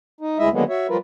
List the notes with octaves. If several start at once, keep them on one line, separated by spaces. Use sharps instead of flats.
D#4
D2 G#3 E4 D#5 E5
D3 D#3 F#3 G#3 A#3 B3
F#4 C#5 E5
F3 G3 F4 A#4 B4